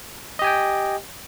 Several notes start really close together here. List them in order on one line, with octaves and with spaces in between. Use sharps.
D#5 G4 G#5 G5